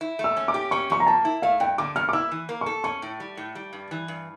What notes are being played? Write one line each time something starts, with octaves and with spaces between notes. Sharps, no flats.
E4
A3
E6
C#4
D6
G4
C#4 C#6
F3 C#6
A#5
A#3 A5
E4
A3 F5
G2 G5
D3 D6
G2 F6
D6
E4 E6
E3
A#3
A4 C#6
C#4 C#6
A2
G3
A2
G3
G2
E3
G2